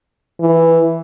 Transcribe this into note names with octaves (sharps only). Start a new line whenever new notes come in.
E3